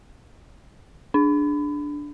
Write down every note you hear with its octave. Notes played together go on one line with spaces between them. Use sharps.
D4